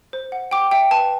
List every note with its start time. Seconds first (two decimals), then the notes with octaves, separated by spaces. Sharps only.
0.13 C5
0.32 F#5
0.51 G5 D6
0.71 E5 G5
0.91 B4 A5